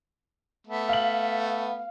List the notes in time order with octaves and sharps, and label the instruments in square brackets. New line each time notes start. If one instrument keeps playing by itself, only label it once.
[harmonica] A3 B3
[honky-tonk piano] F5 F#7